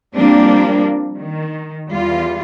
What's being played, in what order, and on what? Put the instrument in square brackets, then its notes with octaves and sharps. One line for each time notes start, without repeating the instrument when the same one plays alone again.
[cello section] F3 G3 A#3 C4 D4
D#3
E2 G3 F4